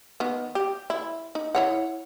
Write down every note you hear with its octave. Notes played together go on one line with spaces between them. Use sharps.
D#3 B3
G4
E4
D#4
E4 C#5 F#5